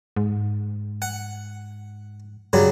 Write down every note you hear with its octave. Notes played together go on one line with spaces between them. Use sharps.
G#2
F#5
G2 C#3 F#3 G3